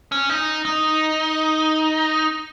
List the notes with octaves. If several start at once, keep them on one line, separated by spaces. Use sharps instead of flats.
C#4
D#4
D#4